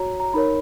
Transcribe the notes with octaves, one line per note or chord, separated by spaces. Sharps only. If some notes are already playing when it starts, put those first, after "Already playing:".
Already playing: F#4 C#5 A#5
A#5
D#4 A#4 C#5 B5